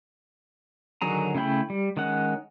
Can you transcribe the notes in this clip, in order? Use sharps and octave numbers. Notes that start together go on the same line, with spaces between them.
D3 D#3 F#3 G#4 A#5
C#3 A3 E4 G5 B5
G3
D#3 G#3 C#4 F#5